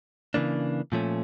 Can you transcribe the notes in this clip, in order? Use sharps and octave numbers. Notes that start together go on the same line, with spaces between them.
C#3 E3 A#3 D4
A#2 F3 A3 C#4